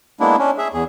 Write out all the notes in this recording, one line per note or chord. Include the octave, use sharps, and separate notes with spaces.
G#3 A#3 B3 D4 E4
C#4 D4
G#4 E5
E2 G#4